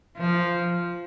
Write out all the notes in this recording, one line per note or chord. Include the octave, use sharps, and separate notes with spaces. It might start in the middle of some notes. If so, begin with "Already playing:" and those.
F3